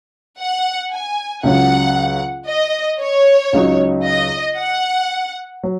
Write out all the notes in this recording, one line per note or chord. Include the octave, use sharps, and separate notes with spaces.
F#5
G#5
C#2 C#3 F#3 F#5
D#5
C#5
C#2 C#3 F#3 D#4
D#5
F#5
F#3